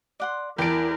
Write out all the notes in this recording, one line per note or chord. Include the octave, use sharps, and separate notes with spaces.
D5 F#5 C6
E2 E4 A#4 G5 A5 D7